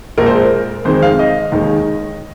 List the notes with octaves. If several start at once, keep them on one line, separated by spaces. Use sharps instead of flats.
A#1 A#2 G#3 A#4
C5
A#4
F2 D#3 G#3 C5
F5
D#5
D#2 D#3 G#3